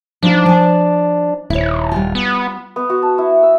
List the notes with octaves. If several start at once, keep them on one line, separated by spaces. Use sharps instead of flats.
F3 D4 D#4 F4
F3 G#5
D#1 E4 C#5
G3 F4
B3
B3
F#4
A5
E4
E6